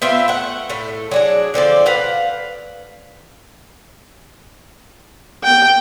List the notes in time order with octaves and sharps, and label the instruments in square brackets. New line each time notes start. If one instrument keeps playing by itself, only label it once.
[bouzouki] B3 C4 F4 E5
A3 F#5
A2 A3
F#3 D4 G#4
D3 F3 C4 D5
B4 F5 F#5
[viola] G5